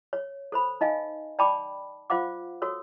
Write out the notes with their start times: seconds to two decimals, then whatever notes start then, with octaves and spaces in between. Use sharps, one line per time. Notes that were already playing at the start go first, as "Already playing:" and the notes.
0.13 C#5
0.52 A4 C5 B5
0.81 D#4 D#5 F5 G#5
1.39 D5 G5 A5 B5 D6
2.10 F4 C5 F5 F#5 D6
2.62 F#4 A4 C#5 E6